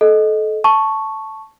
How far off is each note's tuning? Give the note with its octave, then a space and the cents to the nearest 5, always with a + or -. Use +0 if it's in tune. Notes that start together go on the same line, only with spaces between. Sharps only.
A4 -25 D#5 +0
A5 +0 C#6 +0